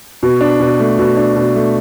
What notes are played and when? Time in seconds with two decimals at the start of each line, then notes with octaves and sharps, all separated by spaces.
0.23 B2
0.41 D4
0.60 B2
0.80 A3
0.99 B2
1.17 D4
1.36 B2
1.55 A3